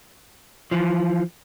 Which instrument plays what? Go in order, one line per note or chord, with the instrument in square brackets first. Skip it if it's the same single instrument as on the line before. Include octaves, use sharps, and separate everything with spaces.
[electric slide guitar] E3 F3